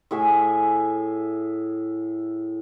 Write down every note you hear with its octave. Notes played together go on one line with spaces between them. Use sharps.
A2 G#4 E5 G#5